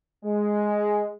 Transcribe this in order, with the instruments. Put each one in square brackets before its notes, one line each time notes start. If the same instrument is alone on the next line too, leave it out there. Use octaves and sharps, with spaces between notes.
[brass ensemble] G#3